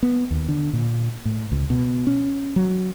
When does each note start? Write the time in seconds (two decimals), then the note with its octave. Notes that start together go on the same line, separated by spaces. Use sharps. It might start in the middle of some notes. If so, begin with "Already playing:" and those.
0.03 B3
0.31 D#2
0.48 D3
0.73 A#2
1.25 A2
1.52 C#2
1.70 B2
2.07 C#4
2.56 F#3